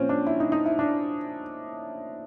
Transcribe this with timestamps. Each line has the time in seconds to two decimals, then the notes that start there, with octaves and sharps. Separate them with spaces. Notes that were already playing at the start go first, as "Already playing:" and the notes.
Already playing: A#2 F3 C4 C#4
0.09 D4
0.26 E4
0.40 D#4
0.52 D#4
0.66 E4
0.79 D4